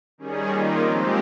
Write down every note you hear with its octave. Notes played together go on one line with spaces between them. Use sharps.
D#3 G3 C#4 G#4
D#3 A#3 F4
F3 G#3 C4 G4